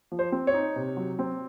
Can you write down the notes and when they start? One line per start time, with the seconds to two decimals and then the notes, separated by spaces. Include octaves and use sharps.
0.12 F3
0.19 C5
0.32 C4
0.47 C#5
0.54 D#4
0.76 C3
0.97 F#3
1.19 C4